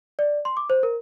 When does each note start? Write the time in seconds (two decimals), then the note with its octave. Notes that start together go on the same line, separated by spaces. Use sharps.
0.19 D5
0.45 C6
0.57 D6
0.70 C5
0.83 A#4